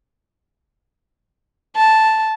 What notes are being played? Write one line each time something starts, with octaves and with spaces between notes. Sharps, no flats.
A5